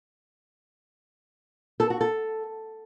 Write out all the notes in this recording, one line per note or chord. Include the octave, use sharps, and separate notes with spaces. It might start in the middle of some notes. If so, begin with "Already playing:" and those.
A4
F#4
A4